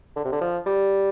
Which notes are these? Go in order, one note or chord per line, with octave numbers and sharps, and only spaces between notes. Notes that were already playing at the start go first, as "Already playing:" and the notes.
D3
C3
D3
F3
G3